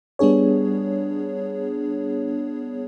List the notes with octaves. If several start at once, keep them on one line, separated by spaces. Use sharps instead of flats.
G3 B3 D4 G#4 C#5